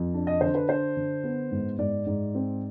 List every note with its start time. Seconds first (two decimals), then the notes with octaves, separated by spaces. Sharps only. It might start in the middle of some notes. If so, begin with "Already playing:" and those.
Already playing: F2
0.14 D4
0.27 D#5
0.41 D3 C5
0.55 B4
0.69 D4 C5
0.97 D3
1.24 B3
1.51 G#2
1.78 G#2 D5
2.06 G#2
2.35 C4